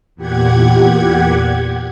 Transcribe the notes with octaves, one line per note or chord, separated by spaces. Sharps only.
E2 A#2 G4 F#5 G#6